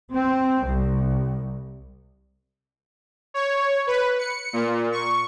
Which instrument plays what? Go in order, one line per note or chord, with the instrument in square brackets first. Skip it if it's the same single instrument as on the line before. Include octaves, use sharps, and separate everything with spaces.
[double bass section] C4
C2
[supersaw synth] C#5
B4
C#7
A#2
C#6